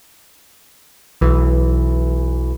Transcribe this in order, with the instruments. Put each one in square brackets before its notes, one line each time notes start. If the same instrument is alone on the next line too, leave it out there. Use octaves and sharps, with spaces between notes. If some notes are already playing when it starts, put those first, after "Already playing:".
[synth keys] B1 E3